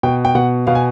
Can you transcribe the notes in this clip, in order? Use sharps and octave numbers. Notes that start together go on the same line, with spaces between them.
B2 G5
G5
B2 F#5
B2 F5
G#5